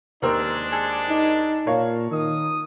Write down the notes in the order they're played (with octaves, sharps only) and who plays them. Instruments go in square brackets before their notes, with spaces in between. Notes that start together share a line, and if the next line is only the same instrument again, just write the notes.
[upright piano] D#2 C5 [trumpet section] G#3 D4 [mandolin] C4 A#4 D5
[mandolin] G#4 A4
[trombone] D#4
[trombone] A#2 [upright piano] A#4 C#5 F5
[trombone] D#3 [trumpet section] D#6